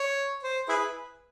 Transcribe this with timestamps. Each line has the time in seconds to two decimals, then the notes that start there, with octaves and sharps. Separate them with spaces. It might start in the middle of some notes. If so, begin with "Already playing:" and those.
Already playing: C#5
0.43 C5
0.69 E4 G#4 B4